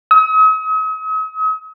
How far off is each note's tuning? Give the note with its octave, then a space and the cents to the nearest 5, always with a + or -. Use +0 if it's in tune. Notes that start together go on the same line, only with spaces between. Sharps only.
D#6 +45